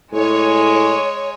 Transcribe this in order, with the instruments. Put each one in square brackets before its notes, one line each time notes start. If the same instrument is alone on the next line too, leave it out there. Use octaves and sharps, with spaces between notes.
[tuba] A2 [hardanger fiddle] G#3 G#5 [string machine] C#5